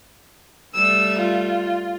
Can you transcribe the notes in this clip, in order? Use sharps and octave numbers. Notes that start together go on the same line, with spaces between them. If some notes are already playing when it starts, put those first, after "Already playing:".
G3 A3 E6
F4